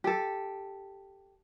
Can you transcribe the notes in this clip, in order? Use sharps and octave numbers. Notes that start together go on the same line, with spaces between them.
G4 A4